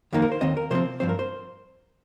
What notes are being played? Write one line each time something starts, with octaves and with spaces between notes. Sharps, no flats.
F2 D#3 A#3 D#4
A#4
C5
D#2 D#3 C4 D#5
A#4
C3 F3 C4 C5
G2 F3 C4 C5
A#4
C5